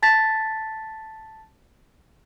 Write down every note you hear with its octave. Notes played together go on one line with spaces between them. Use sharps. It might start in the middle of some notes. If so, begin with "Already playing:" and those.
A5 A6 B6